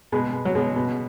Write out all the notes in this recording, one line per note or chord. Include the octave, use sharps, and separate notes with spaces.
B2 G#3
B2
F#3
B2 G#3
B2